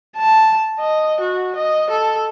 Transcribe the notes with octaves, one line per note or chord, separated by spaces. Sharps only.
A5
D#5
F#4
D#5
A4